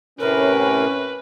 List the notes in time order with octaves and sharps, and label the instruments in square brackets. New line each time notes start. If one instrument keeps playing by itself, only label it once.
[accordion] A2 C3 [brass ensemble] C#4 [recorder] A#4 [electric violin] B4